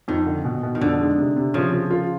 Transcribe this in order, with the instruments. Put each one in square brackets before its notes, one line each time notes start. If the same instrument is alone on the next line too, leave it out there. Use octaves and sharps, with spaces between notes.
[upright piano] F2 [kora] D#3
[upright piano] D3
B2
B2
[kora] D#3
[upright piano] F2 [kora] D3
[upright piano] G#3
C3
C3
[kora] C#3 [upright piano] F3
[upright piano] F3
F4